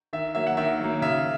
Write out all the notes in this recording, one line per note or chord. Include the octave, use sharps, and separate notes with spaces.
D#3 E5
F#3 A#3 E5
F#5
D#3 E5
F#3 A#3
C#3 E5